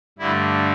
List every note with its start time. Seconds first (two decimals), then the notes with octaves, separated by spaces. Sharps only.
0.19 G2 D3 A3 E4